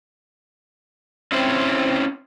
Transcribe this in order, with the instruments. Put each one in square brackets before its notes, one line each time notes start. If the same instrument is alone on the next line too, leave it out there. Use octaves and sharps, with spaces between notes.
[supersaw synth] C4 [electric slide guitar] C#4 E4 C5